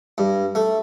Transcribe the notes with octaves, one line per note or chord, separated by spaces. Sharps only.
G2
A3